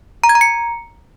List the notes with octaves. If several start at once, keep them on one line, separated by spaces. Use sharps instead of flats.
A#5
G#6
A#5
C#7